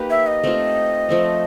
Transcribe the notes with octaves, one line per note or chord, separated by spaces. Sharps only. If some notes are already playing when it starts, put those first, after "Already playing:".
Already playing: A#3 D#4 G4 B4
E5
D#5
A3 C4 F4
F3 A3 C4